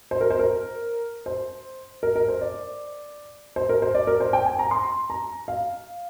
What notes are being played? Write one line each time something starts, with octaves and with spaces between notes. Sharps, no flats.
C5
A#4
C5
A#4
C5
A#4
A#4
C5
D5
C5
A#4
C5
D5
A#4
C5
G5
G#5
A#5
C6
A#5
F5